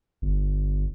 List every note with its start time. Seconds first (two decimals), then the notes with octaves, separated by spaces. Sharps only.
0.22 G1